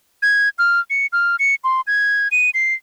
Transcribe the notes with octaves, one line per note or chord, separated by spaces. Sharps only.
G#6
F6
C#7
F6
C#7
C6
G#6
D#7
C7